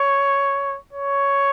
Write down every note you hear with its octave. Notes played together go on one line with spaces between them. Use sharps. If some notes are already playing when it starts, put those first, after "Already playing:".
Already playing: C#5
C#5